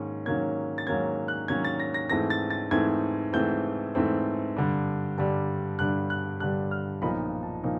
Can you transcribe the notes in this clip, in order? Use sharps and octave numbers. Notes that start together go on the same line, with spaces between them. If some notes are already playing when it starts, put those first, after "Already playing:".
Already playing: G#2 D#3 F#3 A#3 C#4
G#2 D#3 F#3 A#3 C#4 G#6
A6
G#2 D#3 F#3 A#3 C#4 G#6
F#6
G#2 D#3 F#3 A#3 C#4 G#6
A6
A#6
A#6
G#2 E3 A3 C4 A#6
A6
A6
G#2 E3 A3 C4 G#6
G#2 E3 A3 C4 G6
G#2 E3 A3 C4
G2 D3 G3
G2 D3 G3
G2 D3 G3 F#6
F#6
G2 D3 G3 F#6
F6
B1 A#2 F3 A#3 D#4 B5
A5
A#2 F3 A#3 D#4